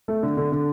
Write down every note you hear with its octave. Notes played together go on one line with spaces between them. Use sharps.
A3
D3
D3
D3